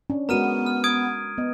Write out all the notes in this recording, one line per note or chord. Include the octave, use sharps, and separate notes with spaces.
C#4 D4
G#3 B3 F#4 A#4 A#5 F6 D#7
F6
D#6 G#6 D7
B3 D#5